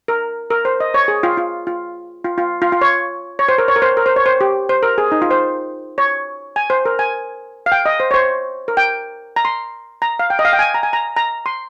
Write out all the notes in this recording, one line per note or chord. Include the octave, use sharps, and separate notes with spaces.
A#4
A#4
C5
D#5
C#5
G#4
F4
F4
F4
F4
F4
F4
F4
C#5
C#5
C5
A#4
C#5
A#4
C5
A#4
C5
C#5
C5
G4
C5
A#4
G#4
D#4
F4
C5
C#5
G#5
C5
A#4
G#5
F5
G5
D#5
C5
C#5
C5
A#4
G5
A#5
C6
A#5
F5
G5
D#5
F5
G5
G#5
A#5
G#5
A#5
A#5
C6